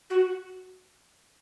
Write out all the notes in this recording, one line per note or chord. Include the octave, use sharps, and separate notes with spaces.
F#4